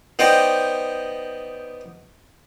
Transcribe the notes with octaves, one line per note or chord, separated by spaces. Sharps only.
B3 D#4 C5 D5 D#5 G5